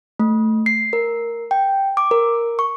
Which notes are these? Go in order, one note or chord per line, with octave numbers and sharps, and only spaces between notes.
A3
C7
A#4
G5
D6
A#4
C#6